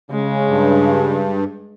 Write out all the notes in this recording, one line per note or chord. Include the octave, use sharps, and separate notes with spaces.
C#3 G#3
G2